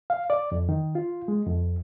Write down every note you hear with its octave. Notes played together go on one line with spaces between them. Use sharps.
F5
D5
F2
D#3
F4
G#3
F2